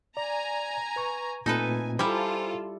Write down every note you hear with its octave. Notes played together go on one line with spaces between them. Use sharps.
D5 G#5 A#5
B4 C#6
A#2 A3 C4 D#4 A4 B4 G#5
G3 E4 F4 A4 C5 G#5 A#5